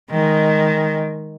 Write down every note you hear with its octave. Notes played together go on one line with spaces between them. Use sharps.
D#3 G#3